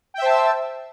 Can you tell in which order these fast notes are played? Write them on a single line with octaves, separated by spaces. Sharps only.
G5 E5 C5 A5 E6